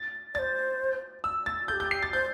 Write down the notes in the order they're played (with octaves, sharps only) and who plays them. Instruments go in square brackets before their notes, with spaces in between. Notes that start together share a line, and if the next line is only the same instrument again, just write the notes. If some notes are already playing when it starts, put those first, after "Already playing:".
Already playing: [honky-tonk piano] A6
[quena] C5 D5 [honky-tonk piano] A6
[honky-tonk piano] E6
A6
[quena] A4 [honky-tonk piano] G6
[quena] G4
[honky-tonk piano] G6
C7
A6
[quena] C5 [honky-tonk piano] G6